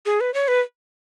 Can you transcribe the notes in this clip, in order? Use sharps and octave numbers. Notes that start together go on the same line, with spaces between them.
G#4
B4
C#5
B4